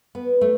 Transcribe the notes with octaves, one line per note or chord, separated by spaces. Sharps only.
B3
A3